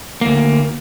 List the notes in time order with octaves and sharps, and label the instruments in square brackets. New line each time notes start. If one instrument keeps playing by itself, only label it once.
[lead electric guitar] D2 A#3